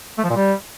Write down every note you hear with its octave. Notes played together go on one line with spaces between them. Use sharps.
A3
F3
A#2
G3